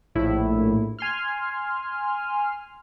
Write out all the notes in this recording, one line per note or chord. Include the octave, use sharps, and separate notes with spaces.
A#1 A2 E4
G#5 C6 F6